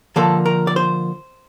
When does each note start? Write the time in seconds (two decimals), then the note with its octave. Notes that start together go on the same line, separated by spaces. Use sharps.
0.16 D3 F3 A#3 A4
0.46 A#4
0.67 D5
0.76 C5